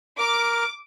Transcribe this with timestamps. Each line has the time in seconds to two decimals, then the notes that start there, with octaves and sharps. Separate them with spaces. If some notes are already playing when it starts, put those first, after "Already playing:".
0.19 A#4 D6 F6